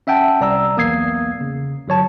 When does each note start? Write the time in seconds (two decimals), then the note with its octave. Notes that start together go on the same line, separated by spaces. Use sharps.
0.07 C#4 E5 F#5 G5 A5
0.41 C2 D5 A#5 E6
0.76 B1 E2 A#3 D#6 G#6 C7
1.41 C#3
1.88 G1 F#3 C#5 A5